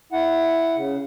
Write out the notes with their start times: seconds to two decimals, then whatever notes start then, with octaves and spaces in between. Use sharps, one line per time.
0.12 E4 F#5
0.76 C#3